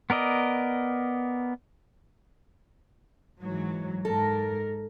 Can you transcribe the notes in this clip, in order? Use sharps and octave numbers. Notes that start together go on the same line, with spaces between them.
B3 A#4 D5 D#5
G#2 E3 F#3
G#2 A4 A#4